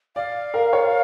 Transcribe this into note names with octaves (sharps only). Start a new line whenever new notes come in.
D5 F5
A#4
C#5